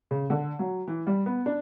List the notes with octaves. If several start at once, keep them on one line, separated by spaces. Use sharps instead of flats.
C#3
D3
F#3
E3
G3
B3
D4